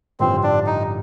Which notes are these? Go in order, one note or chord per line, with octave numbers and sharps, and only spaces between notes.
A1 G2 D3 F3 C4
D4
D#4